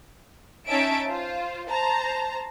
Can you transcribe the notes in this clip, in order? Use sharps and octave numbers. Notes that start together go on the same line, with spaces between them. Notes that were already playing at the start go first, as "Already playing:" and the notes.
C#4 D#4 E5 A5 D7
F4 C5
C5 A5 A#5